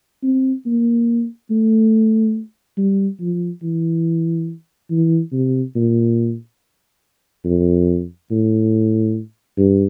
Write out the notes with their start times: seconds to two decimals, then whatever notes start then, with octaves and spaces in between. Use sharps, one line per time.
0.23 C4
0.66 A#3
1.51 A3
2.78 G3
3.20 F3
3.63 E3
4.91 E3
5.32 C3
5.76 A#2
7.45 F2
8.30 A2
9.58 G2